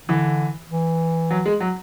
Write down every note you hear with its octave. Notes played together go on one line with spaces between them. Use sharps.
D3 E3
E3
F#3
G#3
F#3